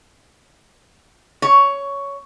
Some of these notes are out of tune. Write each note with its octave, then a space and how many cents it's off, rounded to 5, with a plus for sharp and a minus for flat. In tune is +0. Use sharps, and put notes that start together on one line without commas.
C#5 +10